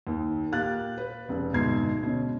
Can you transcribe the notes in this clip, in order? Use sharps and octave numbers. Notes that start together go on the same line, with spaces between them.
D#2
A#2 G4 F5 F#6 A6
B4
F1 C#3
D2 G#2 B2 G#6 C7
B2 D3 C#4